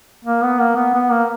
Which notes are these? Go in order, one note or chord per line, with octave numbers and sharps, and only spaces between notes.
A#3
B3
A#3
B3
B3
A#3